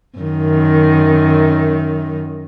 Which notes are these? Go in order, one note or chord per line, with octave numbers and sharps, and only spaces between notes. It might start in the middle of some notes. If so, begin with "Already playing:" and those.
F#2 D#3